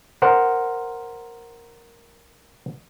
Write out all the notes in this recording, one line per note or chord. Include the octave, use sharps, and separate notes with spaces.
A#4 C5 F#5